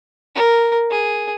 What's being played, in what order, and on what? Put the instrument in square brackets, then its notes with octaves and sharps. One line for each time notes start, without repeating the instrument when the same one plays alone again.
[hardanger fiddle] A#4
G#4